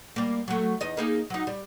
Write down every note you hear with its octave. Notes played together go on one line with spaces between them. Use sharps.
G3 A#3
F#3 A3
E2 D#4 D#5
A#3 D#4 G#4
F#3 D#4
G3